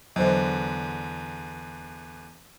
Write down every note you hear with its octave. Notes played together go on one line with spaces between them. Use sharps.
E2 D3 F#3 C5